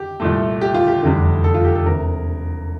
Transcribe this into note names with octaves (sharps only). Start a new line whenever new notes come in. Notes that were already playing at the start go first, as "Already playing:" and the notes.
Already playing: G4
C2 A#2 A3
G4
F4
G4
F1 E2 D3 G3 D4
A4
F4
G4
A4
E1 E2 C3 A#4